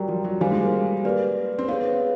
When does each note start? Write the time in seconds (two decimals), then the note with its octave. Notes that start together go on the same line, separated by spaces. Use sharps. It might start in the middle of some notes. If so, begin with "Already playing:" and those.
Already playing: F#3 G3 G4 A#4 D5 G5 A#5
0.08 F3
0.25 F#3
0.40 G3 F#4 A4 C5 F5 G#5
0.52 G#3
0.63 A#3
1.05 A#3 G4 B4 D5
1.58 C4
1.68 B3 G#4 C#5 F5